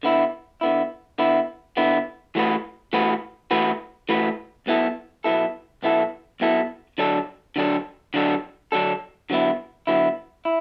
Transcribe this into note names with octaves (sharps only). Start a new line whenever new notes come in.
D3 B3 E4
D3 B3 E4
D3 B3 E4
D3 B3 E4
E3 A3 F#4 B4
E3 A3 F#4 B4
E3 A3 F#4 B4
E3 A3 F#4 B4
B1 B2 B3 E4 A4
B1 B2 B3 E4 A4
B1 B2 B3 E4 A4
B1 B2 B3 E4 A4
D3 F#3 D4 A4
D3 F#3 D4 A4
D3 F#3 D4 A4
D3 F#3 D4 A4
D3 F#3 B3 E4
D3 F#3 B3 E4
E4